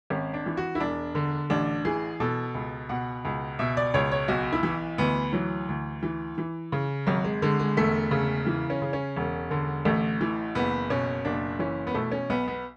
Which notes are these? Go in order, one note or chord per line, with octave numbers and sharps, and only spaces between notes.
G#1 C#4
D4
E3
F#4
E4
E1 D4
D3
A1 D4
E3 G#4
B2 A4
C#2
B2 F#5
C#2
B2 E5
D5
C#2 C#5
C#5
B1 F#4
E4
E3
D2 B3
E3 F#3
D2
E3
E3
C#3
G#1 F#3
G#3
D3 G#3
G#3
E1 A3
C#3
E3
C#4
C#3
C#4
E1
D3
A1 A3
E3
F#1 B3
B2 C#4
F#1 D4
E3 C#4
B3
B2 A3
C#4
B1 B3
B3